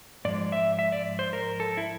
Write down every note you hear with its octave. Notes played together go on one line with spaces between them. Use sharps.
G#2 F3 G#3 D5
E5
E5
D5
C5
A#4
A4
E4